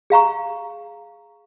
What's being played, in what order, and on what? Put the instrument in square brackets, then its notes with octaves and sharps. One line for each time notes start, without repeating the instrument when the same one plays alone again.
[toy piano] G#4 F5 A#5 C#6